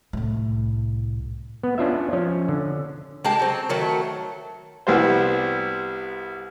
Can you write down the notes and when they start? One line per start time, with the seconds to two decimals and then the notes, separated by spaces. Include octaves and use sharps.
0.13 C2 A2
1.63 B3
1.78 C#4 D4 F4 E5
2.13 F3 C#4
2.49 D3
3.24 G#3 A#3 G4 A5
3.39 F#3 C4
3.69 D#3 F#3 A3
4.87 C2 G3 B3 F#4 C5